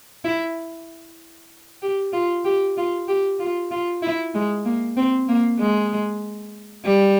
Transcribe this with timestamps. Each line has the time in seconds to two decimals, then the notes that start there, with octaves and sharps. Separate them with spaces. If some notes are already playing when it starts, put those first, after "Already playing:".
0.24 E4
1.82 G4
2.13 F4
2.45 G4
2.77 F4
3.08 G4
3.39 F4
3.71 F4
4.02 E4
4.34 G#3
4.65 A#3
4.97 C4
5.28 A#3
5.59 G#3
6.85 G3